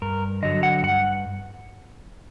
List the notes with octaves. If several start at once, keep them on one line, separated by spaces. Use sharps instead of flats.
G2 A#4
D3 F#3 D#5
F#5
G2 F#5